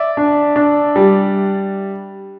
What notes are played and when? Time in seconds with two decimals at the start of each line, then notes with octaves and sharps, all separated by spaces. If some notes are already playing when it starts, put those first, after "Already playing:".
Already playing: D5 E5
0.17 D4
0.56 D4
0.96 G3